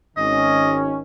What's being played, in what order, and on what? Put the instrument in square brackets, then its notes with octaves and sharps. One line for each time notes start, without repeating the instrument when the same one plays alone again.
[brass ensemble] G#1 D#3 C#4 [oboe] D#5